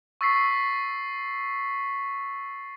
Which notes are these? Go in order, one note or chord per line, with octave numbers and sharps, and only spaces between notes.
C#6 E6 A6 B6 C7